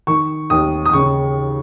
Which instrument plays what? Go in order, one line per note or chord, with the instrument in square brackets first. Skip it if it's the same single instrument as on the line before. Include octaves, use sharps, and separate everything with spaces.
[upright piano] D#3 C#6
D#2 D#6
D#6
C#3 C#6